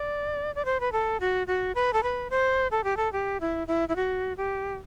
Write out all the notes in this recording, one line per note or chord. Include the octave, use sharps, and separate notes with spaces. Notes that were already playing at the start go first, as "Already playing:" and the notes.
Already playing: D5
D5
C5
B4
A4
F#4
F#4
B4
A4
B4
C5
A4
G4
A4
G4
E4
E4
E4
F#4
G4